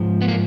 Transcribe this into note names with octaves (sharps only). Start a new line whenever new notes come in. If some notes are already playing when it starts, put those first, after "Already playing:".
Already playing: G#2 F3
B3
A#3